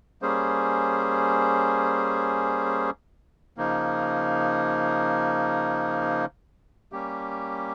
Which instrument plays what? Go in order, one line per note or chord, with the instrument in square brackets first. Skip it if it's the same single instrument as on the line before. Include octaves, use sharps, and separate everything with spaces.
[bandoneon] G3 A#3 C#4 G#4 C5
C#3 F3 A#3 D#4
G3 A#3 C#4 G4